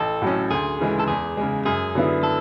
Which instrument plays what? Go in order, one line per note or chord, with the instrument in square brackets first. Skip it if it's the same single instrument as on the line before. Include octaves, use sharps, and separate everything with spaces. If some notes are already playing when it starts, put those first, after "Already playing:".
Already playing: [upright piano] A1 [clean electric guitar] A4
[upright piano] A2 F#3 C#4
[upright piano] D2 [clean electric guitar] G#4
[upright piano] C#3 E3 G#3
[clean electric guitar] A4
[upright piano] E2 [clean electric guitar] G#4
[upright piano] C#3 G#3
[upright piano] F#2 [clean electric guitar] G#4
[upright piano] D3 F#3 B3 E4
[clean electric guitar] A4